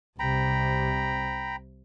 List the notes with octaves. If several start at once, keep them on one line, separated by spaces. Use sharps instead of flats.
C2 C3 G5 A#5 B5